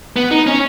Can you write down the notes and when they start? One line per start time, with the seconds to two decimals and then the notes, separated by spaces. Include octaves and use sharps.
0.16 B3
0.31 D#4
0.47 C#4